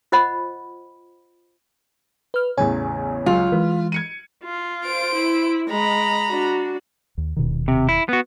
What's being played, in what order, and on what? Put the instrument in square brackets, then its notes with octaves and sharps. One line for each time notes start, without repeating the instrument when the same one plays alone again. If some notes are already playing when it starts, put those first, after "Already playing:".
[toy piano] F4 C5 D#5 F#5 B5
[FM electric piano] B4 F6
[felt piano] A1 E2 C#3 [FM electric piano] C#5 G#5
[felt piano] C#2 F#3 [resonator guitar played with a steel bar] F4
[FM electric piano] E3 G#3 [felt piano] B4
[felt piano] G#6 C#7 D#7
[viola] F4
[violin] C5 D7
[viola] E4
[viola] G#3 D#5 [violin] A#5 B5
[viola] D4 F#4
[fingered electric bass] D#2
D#1 B2 D#3
[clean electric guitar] C3
E4
B3 F#4